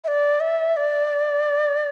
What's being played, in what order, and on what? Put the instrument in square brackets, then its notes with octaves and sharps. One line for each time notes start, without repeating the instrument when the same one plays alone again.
[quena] E5
D5
E5
D5